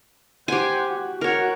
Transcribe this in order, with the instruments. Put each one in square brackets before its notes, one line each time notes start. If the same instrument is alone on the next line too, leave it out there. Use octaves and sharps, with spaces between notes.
[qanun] G4 G#5 [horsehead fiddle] C5 F#5
[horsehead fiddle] F#4
[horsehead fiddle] F#4 [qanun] A#4 C#5